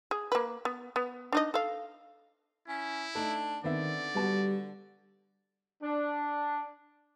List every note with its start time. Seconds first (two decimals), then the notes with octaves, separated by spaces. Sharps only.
0.11 G#4
0.32 A#3 B4
0.65 B3
0.96 B3
1.32 D4 D#4 D#5
1.54 A4 F5
2.68 C#4 E4
3.15 A3 D4 D#4
3.64 D3 D#3 B3 C4 D5 E5
4.15 G3 B3 F#4 A5
5.83 D4